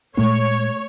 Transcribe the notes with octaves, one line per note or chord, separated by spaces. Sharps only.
A#2 G#3 A3 C#5